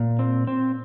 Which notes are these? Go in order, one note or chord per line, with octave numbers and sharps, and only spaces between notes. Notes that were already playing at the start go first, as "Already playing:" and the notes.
Already playing: A#2
C4
C4